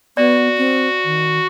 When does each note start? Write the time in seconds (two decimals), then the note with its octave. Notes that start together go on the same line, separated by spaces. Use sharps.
0.17 B3 F#4 D5
0.57 C4
1.05 D#3